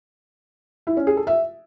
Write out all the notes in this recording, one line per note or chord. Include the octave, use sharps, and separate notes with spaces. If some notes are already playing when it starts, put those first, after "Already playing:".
E4
C#4
G#4
A4
E5